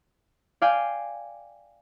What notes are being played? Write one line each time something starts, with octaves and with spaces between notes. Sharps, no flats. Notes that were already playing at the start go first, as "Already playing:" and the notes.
D5 F5 G5 G#5